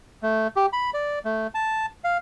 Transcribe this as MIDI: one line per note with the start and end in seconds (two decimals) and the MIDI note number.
0.22 0.47 57
0.56 0.66 67
0.73 0.90 83
0.94 1.19 74
1.25 1.47 57
1.55 1.86 81
2.04 2.18 77